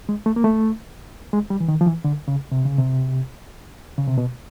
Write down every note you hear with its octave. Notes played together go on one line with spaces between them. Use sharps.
G#3
A3
A#3
A3
G#3
G3
E3
D#3
F3
E3
D3
C#3
C3
C#3
C3
C#3
C3
B2